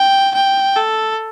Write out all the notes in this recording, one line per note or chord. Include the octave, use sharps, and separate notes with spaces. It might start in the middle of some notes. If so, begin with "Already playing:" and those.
Already playing: G5
G5
A4